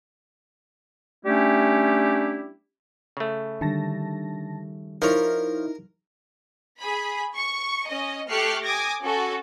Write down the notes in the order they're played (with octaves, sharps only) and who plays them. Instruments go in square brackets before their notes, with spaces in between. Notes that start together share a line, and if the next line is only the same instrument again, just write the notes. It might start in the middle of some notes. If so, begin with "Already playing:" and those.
[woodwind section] G3 A3 C#4 D4 E4 G4
[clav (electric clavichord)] C#3 A3
[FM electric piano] D3 A5 A#6 [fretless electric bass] D#3 G3
[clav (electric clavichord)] F3 C#5 [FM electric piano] D#4 E4 [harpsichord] A#4
[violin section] G#4 B5
C#6
C#4 D#5
A3 G4 C#6 F6 F#6 C7
G#5 D6 D#6 G#6 A#6
C#4 F#4 A4